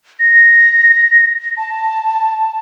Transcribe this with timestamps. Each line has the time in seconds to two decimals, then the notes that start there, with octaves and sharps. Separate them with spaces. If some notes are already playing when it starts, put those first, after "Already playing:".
0.20 A#6
1.57 A5